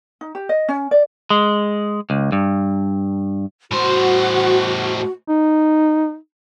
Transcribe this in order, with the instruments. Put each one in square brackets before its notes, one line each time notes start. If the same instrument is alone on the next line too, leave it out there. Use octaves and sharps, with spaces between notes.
[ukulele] D#4
G4
D#5
C#4
D5
[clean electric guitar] G#3
C#2
G2
[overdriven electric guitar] A2 C5 [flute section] F#4
[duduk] D#4